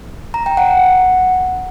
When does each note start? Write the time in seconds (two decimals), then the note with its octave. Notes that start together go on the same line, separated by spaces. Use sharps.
0.34 A#5
0.46 G5
0.57 F#5